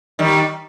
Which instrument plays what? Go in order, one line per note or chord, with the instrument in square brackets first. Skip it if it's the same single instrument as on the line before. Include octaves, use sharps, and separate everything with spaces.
[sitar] D#3 G3